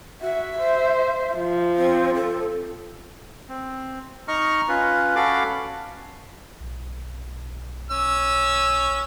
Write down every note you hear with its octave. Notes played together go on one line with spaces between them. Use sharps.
F#4 E5
C5
F3
C4
A4
C4
D#4 D#5 A#5 C#6 F6
C#4 F4 B4
C#4 F#4 A4 F5 B5 D6
B1
C#4 E6